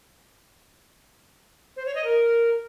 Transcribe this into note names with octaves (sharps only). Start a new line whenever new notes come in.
C5
C#5
D#5
A#4